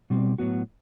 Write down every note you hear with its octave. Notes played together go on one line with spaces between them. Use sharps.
B2 G3 C4
A2 F#3 B3 F#4